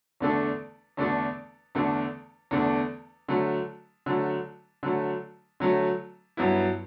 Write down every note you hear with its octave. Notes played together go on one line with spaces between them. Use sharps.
E2 D3 A3 D4 A4
E2 D3 A3 D4 A4
E2 D3 A3 D4 A4
E2 D3 A3 D4 A4
D3 F#3 A3
D3 F#3 A3
D3 F#3 A3
D3 F#3 A3
G2 F#3 B3 E4